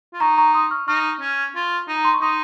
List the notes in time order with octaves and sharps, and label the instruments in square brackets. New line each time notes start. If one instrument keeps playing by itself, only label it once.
[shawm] F4
[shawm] D#4 [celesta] A#5 C#6
[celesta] A#5 C#6
C6 D#6
C#6 F6
[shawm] D#4 [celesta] C#6 F6
[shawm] C#4
F4
D#4
[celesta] A#5
C6
C#6
[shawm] D#4 [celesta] C6 D#6